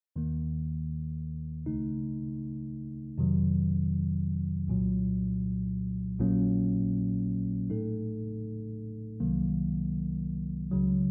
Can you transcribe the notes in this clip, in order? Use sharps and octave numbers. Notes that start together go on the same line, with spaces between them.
D#2 D#3 A#3
C#2 C#3 A3 D#4
F2 C3 D#3 F#3
C2 A#2 F#3
A#1 A#2 F#3 A#3 C#4
A2 A3 D#4 A4
C2 C3 D#3 F#3 A#3
C#2 C#3 F#3